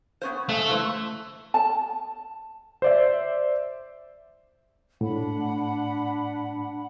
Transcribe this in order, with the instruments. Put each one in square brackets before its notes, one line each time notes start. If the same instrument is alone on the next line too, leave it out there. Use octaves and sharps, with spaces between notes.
[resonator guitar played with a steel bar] B3 C#4 C5
[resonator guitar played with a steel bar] G#3 E5 [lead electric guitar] A3
[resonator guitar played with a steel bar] C#3 E3 C5
[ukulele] A5
[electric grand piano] C5 D5 E5
[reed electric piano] A2 [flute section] D4 F#5 B5